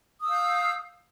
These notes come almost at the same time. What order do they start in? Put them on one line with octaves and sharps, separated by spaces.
D#6 E6 F5 G6